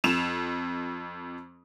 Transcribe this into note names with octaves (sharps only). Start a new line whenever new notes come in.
F2 E7 F7